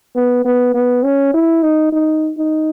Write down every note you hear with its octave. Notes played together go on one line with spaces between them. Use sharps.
B3
B3
B3
C#4
E4
D#4
D#4
D#4